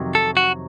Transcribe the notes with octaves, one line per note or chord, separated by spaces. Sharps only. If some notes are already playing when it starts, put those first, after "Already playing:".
Already playing: F2 C3 D#3 F#3
A4
F#4